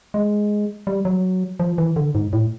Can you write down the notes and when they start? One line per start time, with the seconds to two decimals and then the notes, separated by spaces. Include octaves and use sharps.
0.14 G#3
0.87 G3
1.05 F#3
1.60 F3
1.78 E3
1.96 D3
2.15 G#2
2.33 A2